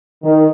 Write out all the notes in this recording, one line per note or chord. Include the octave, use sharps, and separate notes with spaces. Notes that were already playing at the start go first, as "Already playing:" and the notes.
D#3